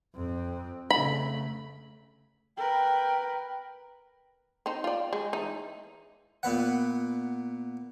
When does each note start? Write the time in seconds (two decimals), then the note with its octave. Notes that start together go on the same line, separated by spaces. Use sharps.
0.15 F2 C4
0.91 C#3 A3 B5
2.57 A#4 B4 G5
4.66 C4 D#4
4.84 F4 D5
5.13 G#3
5.33 E3 D#4
6.43 A#2 B3 B4 F#5